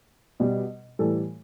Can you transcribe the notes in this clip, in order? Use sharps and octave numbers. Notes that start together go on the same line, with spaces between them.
B2 G3
A2 E3 G3 A4